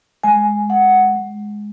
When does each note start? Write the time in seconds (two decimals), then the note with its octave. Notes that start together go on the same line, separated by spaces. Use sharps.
0.24 G#3 G#5
0.69 G#3 F#5
1.15 G#3